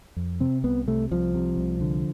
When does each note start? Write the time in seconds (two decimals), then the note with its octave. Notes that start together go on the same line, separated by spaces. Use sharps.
0.16 F2
0.40 C3 C4
0.64 C2 B3
0.87 C3 A3
1.11 C2 F3
1.34 C3
1.58 C2
1.81 D3